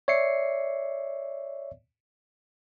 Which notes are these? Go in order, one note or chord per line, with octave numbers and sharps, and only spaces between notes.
C#5 D5 E5 C7 C#7